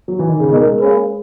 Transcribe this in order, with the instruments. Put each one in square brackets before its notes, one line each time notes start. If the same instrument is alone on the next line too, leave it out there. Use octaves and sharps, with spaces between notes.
[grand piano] F#3
E3
D#3
C#3
[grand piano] B2 [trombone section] G#3 D#4 A#4
[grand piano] G#3
[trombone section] A#3 C#4 G#4 B4